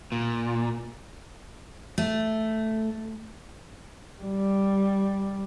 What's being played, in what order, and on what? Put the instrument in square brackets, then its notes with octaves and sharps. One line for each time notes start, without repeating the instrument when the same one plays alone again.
[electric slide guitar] A#2
[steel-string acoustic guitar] A3
[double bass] G3